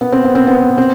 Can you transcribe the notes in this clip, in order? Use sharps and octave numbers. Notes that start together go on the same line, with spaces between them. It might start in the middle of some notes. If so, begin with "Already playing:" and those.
B3
C4
B3
C4
B3
C4